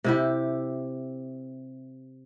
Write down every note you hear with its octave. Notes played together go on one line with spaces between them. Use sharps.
C3 E4 G4